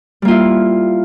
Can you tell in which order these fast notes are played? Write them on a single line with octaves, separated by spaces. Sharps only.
G3 A#3 F4 E4